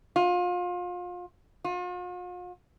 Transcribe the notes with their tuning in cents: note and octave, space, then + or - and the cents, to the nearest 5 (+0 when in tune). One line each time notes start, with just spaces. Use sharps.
F4 +30
F4 +45